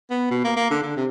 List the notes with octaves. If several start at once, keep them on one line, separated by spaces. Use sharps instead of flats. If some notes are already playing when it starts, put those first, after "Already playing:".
B3
B2
A#3
A#3
D3
D3
C3